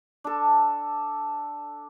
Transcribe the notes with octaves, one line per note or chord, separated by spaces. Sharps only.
D4 A4